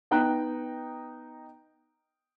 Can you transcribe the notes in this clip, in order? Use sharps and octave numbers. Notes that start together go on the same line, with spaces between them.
B3 D#4 G5 A#5 F#6